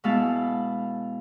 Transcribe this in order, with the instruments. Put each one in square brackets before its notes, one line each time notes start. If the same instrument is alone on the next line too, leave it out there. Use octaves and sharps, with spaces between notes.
[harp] B2 G#3 B3 E4 F5 A5